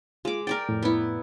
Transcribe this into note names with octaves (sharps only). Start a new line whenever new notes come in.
G#3 F4 D6
A#4 D5 G5 A6
F2 A2
B3 E4